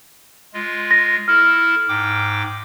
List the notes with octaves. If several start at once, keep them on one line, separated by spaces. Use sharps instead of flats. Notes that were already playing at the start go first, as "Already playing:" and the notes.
G#3 F4
A#6
E4 A4 F6
G#2 G5 D6